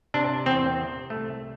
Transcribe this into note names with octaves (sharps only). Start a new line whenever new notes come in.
C3 D4
E2 C4
C3
C2 A3